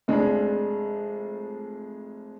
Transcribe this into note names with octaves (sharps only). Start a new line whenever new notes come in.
F1 G#3 D4 G#4